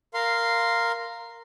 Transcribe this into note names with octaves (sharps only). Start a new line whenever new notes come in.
A#4 F5 C6